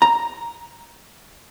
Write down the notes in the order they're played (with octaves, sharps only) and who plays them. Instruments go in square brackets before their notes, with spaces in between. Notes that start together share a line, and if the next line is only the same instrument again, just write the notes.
[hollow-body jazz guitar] A#5